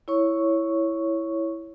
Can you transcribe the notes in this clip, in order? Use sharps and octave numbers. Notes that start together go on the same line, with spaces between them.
E4 C#5 C#6